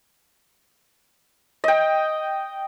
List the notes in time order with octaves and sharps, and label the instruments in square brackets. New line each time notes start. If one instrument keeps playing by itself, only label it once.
[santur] D#5 G5